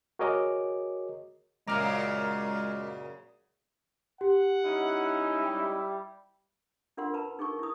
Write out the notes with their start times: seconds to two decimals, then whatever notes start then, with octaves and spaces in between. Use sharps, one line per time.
0.19 F#4 G#4 A#4 C#5 D#5 D6
1.67 F#2 A#2 C#3 G#3 A#5 D6 F6
4.21 G4 F#5
4.64 G#3 C#4 D#4 E4
5.42 G3
6.97 D4 F4 A#4 F#5 C6
7.14 B4 A5 A#5
7.39 D#4 G#4 A#4 C#6
7.59 E4 D#6